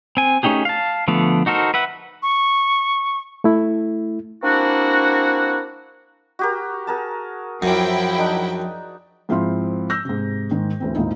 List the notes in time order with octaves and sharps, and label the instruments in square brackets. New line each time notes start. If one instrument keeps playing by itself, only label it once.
[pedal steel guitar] C4 G#5
A3 C#4 D#4 G4 G#4
F5 A5
D3 F3 A3 B3
D#4 F#4 A4 A#4 C5
B4 E5 F#5
[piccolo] C#6
[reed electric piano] A3 E4
[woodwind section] A#3 C4 D4 E4 F#4
[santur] F#4 G4 A#4
G#4 A#4 A5
[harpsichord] F#2 [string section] F3 E4 G5 [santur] G#5 D6
[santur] D4 D#4
[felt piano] G#2 F3 C4 E4 F5 C6
E6 G6 A#6
G#2 C3
G#2 D#3 G#3
D2 E3 C4
G#1 D#2 A#2 D#4 E4